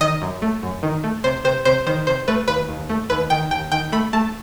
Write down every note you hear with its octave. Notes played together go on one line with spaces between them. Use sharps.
D#3 D#5
F#2
A3
F#2
D#3
A3
C3 C5
C3 C5
C3 C5
D#3 C5
C3 C5
A3 B4
D#2 B4
D#2
A3
D#2 B4
D#3 G5
D#2 G5
D#3 G5
A3 B5
A3 A5